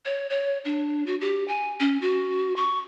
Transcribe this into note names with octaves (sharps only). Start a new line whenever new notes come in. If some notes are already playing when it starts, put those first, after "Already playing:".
C#5
C#5
D4
F#4
G4
G#5
C#4
F#4
C#6